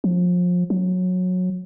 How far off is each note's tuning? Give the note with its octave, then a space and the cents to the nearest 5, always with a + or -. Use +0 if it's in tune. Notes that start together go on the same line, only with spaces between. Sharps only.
F3 +30
F#3 -20